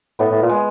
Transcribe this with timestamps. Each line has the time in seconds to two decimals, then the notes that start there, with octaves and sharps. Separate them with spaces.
0.19 A2 B3
0.31 A2
0.42 A#2
0.49 G#3